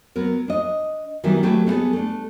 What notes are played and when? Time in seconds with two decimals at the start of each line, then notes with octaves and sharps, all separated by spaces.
0.16 F#3 B3 A#4
0.48 D4 D#5
1.24 D#3 E3 F#3 G3 B3 E4
1.43 F#3 A3 G4 B4
1.66 G3 B3 E4 F4 G#4 A4
1.93 A3 D4